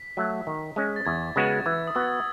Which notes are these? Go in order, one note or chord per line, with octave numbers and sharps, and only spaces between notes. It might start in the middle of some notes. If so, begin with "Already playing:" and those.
Already playing: B6
F#3 A3
D#3
G#3 C#4
A6
E2 G#6
C#3 G#3 B3 F#4
E3 G#6
D#6
B3 F#4 E6